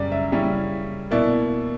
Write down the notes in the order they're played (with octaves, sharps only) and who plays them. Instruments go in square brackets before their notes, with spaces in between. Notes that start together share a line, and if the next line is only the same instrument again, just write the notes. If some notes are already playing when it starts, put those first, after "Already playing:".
Already playing: [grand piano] F#2 C#3 G3 D5
E5
C#3 G3 C#4 E4
B2 A#3 E4 D5